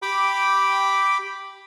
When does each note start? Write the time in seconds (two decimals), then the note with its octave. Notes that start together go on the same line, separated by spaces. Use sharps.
0.02 G4 G5 B5 D6